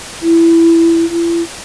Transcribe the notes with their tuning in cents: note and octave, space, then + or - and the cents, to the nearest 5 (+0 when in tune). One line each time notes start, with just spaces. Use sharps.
E4 +15
E4 +40